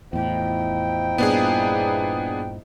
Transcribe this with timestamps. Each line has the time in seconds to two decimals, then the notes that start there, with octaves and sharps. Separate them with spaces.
0.13 E2 A2 F3 D#4 E4 G5
1.18 G2 A#2 B3 D4 G#4